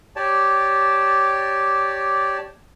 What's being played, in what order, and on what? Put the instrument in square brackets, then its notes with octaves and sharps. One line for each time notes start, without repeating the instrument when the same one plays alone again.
[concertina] G4 C#5 D5 A5